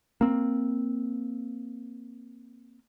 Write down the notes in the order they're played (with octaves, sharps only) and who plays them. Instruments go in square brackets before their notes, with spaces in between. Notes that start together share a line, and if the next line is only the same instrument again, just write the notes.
[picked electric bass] A#3 C4